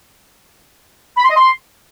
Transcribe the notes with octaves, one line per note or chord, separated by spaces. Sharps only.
B5
C6
D#5
C6